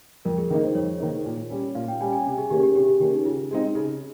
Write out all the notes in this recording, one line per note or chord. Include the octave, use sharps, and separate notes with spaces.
F2 A#4
G#4
D#3 A#3 D#4 A#4
C5
F2 C#5
D#3 A#3 D#4
A#2
G3 C#4
A#2 F5
G5
G3 C#4 G#5
G#5
C3
G#4
D#3 A#3 C#4 G4
G4
C3 G4
G4
D#3 A#3 C#4 G4
D#4
C#3 F4
G#3 C4 D#4
C#3